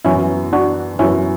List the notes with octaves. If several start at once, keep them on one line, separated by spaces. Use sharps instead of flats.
F#2 E3 B3 C#4 E4
D4 F#4
F#2 E3 B3 C#4 E4